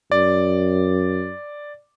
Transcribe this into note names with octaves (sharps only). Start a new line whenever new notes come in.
F#2 D5